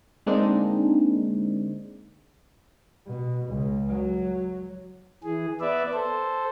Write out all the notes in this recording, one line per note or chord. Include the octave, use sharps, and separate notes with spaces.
D3 G#3 A#3 C4 D4 D#4
B2
C#2
F#3
E3 G#4
B3 B4 D5 E5
A4 C5